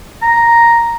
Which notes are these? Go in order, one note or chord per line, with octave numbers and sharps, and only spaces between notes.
A#5